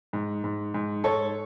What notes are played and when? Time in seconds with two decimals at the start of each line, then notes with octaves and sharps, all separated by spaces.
0.13 G#2
0.44 G#2
0.74 G#2
1.04 G#2 A4 C#5